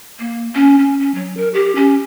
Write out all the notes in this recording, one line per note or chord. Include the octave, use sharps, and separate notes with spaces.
A#3
C#4
C#4
C#4
F#3
A#4
G4
C#4